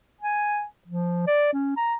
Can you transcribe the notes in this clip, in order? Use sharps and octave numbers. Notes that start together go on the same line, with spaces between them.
G#5
F3
D5
C#4
A#5